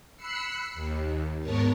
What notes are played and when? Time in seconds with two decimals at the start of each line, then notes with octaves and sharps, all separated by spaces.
0.16 B5 E6 F#6 C7 C#7
0.74 D#2
1.40 G#2 B3 A#4 C#5 A5